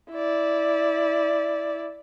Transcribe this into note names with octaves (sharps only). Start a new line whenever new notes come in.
E4 D5